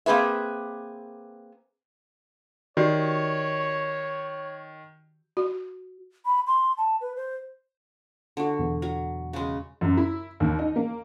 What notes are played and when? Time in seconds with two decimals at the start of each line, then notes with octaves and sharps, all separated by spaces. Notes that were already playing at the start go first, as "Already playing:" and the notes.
0.06 A#3 C4 G#4 B4 E5
2.77 D#3 F#4 G4 C#5 D5
5.37 F#4
6.25 B5
6.47 C6
6.78 A5
7.01 B4
7.16 C5
8.37 D3 F#4
8.59 E2 B2
8.82 F#3
9.33 C#3 G#3
9.81 F#2
9.97 E4
10.40 D#2
10.59 D#4
10.76 A#3